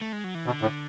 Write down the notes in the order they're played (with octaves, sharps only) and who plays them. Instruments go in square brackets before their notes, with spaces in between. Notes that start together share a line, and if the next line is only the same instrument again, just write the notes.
[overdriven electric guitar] A3
G#3
F#3
E3
[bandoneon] B2 [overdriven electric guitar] D3
[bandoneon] A2